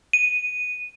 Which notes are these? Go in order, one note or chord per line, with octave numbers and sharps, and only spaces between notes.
D#7